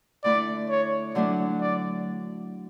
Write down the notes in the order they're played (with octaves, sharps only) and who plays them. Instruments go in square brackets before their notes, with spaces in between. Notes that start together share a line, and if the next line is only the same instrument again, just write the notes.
[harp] D3 A3 E4 [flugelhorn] D5
[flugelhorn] C#5
[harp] D3 F#3 A3 D4 [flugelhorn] D5
[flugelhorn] D5